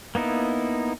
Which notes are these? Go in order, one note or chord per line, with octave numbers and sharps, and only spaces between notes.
A#3 B3 D#4 E4